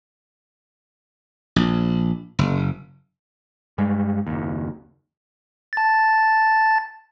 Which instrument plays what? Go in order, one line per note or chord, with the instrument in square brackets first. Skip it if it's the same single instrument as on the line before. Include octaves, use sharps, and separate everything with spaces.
[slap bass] A#1
F#1
[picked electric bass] G2 G3 G#3
F#1 D#2
[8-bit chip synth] A5 A6